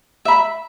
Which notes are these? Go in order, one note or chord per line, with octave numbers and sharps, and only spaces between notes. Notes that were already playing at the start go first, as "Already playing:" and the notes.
E5 B5